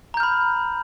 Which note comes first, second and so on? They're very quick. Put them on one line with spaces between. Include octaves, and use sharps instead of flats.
A#5 G6 F6 B5